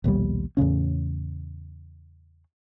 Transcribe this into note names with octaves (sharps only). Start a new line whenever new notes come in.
A#1 D#2 B2 G3
E2 A2 C#3 C#4